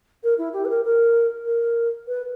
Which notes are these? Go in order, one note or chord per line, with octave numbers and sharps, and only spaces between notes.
A#4
E4
G4
B4
A#4
A#4
A#4
B4